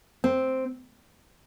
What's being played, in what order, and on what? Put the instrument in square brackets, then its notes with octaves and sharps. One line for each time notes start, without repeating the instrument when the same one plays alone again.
[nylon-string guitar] C4